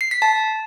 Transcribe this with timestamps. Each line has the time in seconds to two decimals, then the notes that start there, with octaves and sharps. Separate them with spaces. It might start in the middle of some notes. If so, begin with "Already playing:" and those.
0.01 C7
0.11 B6
0.22 A5